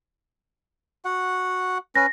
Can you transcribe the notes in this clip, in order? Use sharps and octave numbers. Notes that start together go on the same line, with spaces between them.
F#4 F#5
C#4 B4 A#6